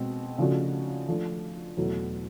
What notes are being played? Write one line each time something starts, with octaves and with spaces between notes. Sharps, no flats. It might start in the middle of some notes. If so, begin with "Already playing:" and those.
Already playing: B2 G#3 C4
C#3 F3 A3 D4 F#4
F3 A3 D4
E2 B2 F#3 A3